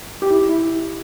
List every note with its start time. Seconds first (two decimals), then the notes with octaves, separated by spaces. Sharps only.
0.22 G4
0.30 E4
0.49 E4